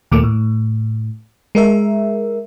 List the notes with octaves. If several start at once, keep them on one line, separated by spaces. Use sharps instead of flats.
D#2 A#2 A3 A#3 D6
A2
G#3 A#4 E5